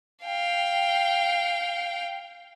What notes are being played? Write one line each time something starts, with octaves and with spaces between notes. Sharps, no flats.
F5 G5